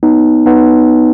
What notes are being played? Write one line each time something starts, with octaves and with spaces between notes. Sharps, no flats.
B3 D#4
B3 D#4